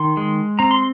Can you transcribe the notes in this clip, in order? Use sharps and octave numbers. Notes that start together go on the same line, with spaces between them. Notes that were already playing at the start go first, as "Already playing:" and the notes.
Already playing: D#3 C6
G#3
C4 A#5
C6